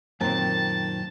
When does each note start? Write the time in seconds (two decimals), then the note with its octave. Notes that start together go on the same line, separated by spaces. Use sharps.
0.21 F#2 A#2 D#3 A#3 C4 A5